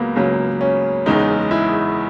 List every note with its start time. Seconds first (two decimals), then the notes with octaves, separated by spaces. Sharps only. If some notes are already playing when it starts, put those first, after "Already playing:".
Already playing: C#2 C#3 F#3 A#3 B3
0.16 C#2 C#3 F#3 A#3
0.61 C#4
1.06 F#1 E2 C#3 G#3 D#4
1.51 E4